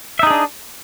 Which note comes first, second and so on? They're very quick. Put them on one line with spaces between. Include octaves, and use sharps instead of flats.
E5 D#4 G#4 D4